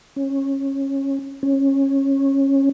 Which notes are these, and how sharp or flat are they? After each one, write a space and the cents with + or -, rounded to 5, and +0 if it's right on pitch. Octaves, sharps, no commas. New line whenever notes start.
C#4 -20
C#4 -20